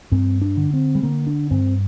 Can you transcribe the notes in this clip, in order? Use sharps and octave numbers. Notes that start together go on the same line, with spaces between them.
G2 C4
D4
D3
C4
G3
D3 A#3
D4
G2 C4